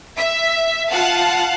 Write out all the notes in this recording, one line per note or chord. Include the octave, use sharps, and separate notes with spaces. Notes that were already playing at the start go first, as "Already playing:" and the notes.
E5
F4 F5 F#5 A5